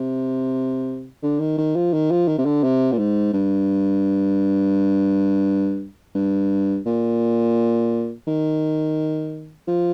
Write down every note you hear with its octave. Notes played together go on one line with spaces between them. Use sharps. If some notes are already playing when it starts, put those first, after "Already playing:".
Already playing: C3
D3
D#3
D#3
F3
D#3
F3
D#3
C3
D3
C3
A#2
G#2
G2
G2
A#2
D#3
F3